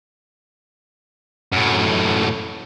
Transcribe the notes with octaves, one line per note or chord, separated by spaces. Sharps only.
F#2 A2